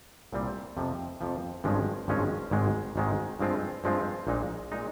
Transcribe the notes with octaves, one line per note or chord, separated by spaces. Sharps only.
C2 A#2 G3 C4
F2 C3 F3
F2 C3 F3
G#1 G2 F3 G#3 C#4
G#1 G2 F3 G#3 C#4
G#1 G#2 D#3 G#3
G#1 G#2 D#3 G#3
G2 F3 G#3 C4 F4
G2 F3 G#3 C4 F4
A#1 A#2 G#3 D#4
A#2 G#3 D#4